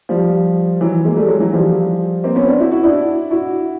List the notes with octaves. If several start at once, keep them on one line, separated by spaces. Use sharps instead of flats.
F3 G3
E3 F#3
G#3 A#3
G3 A3
F#3 G#3
E3 F#3
F3 G3
A#3 C4
B3 C#4
C4 D4
E4 F#4
E4 F#4
D4 E4
E4 F#4